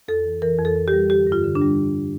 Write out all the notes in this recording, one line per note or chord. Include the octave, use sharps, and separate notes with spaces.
F2 A4
E3
E3 A#4
F2
A4
F2
G4
G3
D3 G4
G2
F4
D3
D4
G3